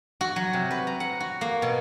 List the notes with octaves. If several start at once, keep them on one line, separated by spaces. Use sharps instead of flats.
F#4
F#3
C3
B4
A#5
F#5
F#4
A#3
B2